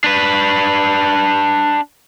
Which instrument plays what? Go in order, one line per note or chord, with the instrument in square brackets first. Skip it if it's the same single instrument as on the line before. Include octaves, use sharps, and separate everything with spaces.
[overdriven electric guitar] D4 B4